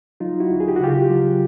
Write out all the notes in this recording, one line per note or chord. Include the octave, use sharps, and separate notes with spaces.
F#3 D#4 F4
E4 F#4
D2
G#4
G4
F#4
C#3 F4 G4
F#3